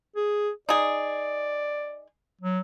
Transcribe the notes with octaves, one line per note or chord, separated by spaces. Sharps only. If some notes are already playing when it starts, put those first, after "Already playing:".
G#4
D#4 G#4 D5
F#3